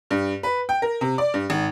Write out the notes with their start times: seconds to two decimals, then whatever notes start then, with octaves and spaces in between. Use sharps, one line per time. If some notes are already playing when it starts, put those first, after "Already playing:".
0.11 G2
0.43 B4
0.69 G5
0.82 A#4
1.01 C3
1.18 D5
1.34 G2
1.50 G#1